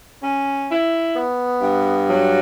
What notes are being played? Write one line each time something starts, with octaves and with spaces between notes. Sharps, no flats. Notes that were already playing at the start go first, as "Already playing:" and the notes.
C#4
E4
B3
G2
F#3